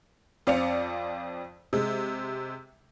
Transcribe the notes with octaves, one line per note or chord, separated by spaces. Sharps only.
F2 C4 D5 F5 C#7 F7
C3 G#3